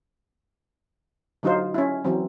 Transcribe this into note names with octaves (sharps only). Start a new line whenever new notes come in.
D3 F#3 D#4 F4 C5
C#4 E4
E3 F#3 C4